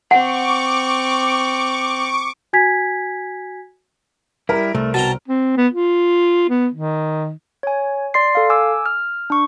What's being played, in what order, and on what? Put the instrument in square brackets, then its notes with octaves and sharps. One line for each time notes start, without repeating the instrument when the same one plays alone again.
[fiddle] C4 [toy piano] F#5 [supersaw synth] C#6 D6
[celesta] F#4 G#5 G#6 B6
[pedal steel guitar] G3 E4 [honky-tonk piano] A#4
[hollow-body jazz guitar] C2 [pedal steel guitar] A3
[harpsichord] B2 G5 A#5 [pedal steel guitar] A5
[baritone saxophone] C4
B3
F4
B3
D#3
[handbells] C#5 G#5
D5 C6 C7
A4 F5
G#5 D6 E6
F6
D4 C#6